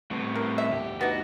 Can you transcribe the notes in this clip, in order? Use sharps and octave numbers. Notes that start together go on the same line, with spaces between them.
A2 G3 B3 C4
A#4
E5
D2 G4
B3 D#4 F#4